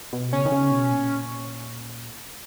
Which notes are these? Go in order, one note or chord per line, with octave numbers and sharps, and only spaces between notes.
B2
C#3 C#4
D#3
C#3
B2
A#2